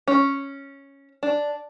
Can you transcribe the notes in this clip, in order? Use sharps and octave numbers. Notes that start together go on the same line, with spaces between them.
C#4
D4